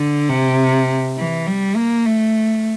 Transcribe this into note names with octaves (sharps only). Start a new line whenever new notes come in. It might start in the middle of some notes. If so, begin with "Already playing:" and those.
Already playing: D3
C3
E3
G3
A#3
A3